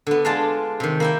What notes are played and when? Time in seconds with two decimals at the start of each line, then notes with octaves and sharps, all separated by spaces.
0.07 D3 B3
0.25 G#3 D4 F4 D5 A5
0.80 C3 D#3
1.00 A#3 E4 G5